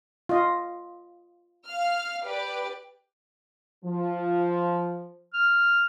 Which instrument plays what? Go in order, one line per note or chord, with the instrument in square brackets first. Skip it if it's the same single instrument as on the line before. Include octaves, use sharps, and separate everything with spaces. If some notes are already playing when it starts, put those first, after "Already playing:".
[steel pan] F4 D#5
[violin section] F5 F6
G4 B4 D5
[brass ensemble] F3
[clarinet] F6